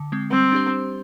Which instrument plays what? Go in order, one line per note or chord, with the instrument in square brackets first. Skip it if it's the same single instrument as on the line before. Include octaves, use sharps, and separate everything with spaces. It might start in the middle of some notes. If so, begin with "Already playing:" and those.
Already playing: [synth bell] D3
G#3 C4
[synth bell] G3 [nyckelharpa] C4
[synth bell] D4 G4 C5